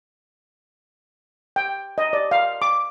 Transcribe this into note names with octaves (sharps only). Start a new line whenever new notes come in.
G5
D#5
D5
F5
D6